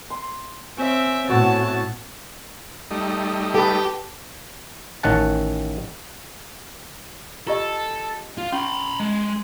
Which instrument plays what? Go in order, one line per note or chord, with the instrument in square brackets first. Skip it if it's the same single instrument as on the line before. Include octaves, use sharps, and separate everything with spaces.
[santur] C6
[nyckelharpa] C4 E5 [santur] C#4 E6
[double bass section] A2 [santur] B3 C#5 E6 [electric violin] F#4 [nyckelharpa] A5
[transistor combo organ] G3 A3 D#4
[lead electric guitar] G4 [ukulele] A4 B4
[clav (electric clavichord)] A1 D#3 C#4 F#5 A5
[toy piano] F4 G4 D#5 [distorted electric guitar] A4
[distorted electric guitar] F4
[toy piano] C#4 [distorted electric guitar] B5 C6
[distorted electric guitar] G#3